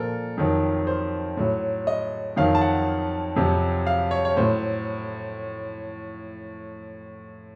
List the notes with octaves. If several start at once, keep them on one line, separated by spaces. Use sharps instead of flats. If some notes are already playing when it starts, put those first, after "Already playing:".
Already playing: A#2 F3 A4 A#4
F2 D#3 F#3
C5
A2 F#3
D#5
F2 D#3 F#3 F5
A5
F#5
F2 C3 F#3
F5
C#5
C#5
A2 F#3 C5